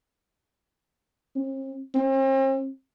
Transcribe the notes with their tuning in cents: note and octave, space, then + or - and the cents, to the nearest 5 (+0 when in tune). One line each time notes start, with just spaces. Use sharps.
C4 +45
C4 +45